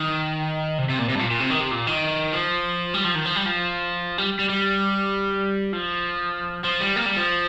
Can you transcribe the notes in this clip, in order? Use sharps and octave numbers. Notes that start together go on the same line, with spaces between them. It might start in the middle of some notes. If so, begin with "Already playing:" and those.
Already playing: D#3
C3
C3
A#2
C3
G2
A#2
A#2
C3
D#3
C3
A#2
D#3
F3
G3
F3
D#3
F3
G3
F3
G3
G3
G3
F3
F3
G3
A#3
G3
F3